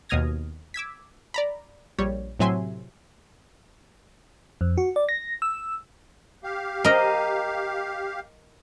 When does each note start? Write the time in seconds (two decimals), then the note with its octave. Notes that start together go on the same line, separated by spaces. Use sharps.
0.09 D#2 B2 D#6 F6 G#6 A#6
0.74 D6 E6 G#6 B6
1.34 D5 A#5 B5
1.98 A#1 G3 C#5
2.39 A2 C3 F#3 E5 G#5 C6
4.61 F2
4.78 F#4
4.96 D5
5.09 A#6
5.42 E6
6.44 G4 F5
6.84 A#4 D#5